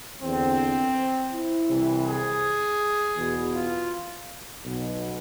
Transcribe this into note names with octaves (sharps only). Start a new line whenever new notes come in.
E2 D3 C4
E4
C2 C3 E3
G#4
E2 B2
F4
B1 B2